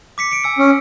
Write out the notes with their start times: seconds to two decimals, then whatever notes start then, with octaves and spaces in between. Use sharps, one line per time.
0.18 D6 B6 C#7
0.31 C#7 D7
0.44 G#5 E6 C#7
0.58 C#4